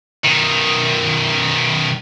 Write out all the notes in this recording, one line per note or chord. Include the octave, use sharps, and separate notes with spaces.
B1 D#3